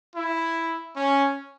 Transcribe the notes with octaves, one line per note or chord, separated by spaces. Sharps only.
E4
C#4